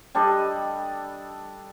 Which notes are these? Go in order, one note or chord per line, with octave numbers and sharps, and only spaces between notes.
G3 D4 A4 D#5